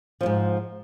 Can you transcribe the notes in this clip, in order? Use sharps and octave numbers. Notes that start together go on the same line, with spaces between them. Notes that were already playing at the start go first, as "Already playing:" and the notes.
F2 G#2 F3